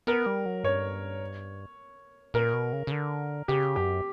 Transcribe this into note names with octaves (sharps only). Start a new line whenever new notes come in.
B3 A#4
G3
F#3
G2 C#5
A#2 A#4
B2
C#3
C#3
D3
C#3 G4
F#2 G4